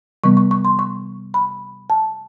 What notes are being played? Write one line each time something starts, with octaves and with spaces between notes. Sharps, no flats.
C3 E3 G3 B3 C#6
C#6
C#6
C6
C#6
B5
A5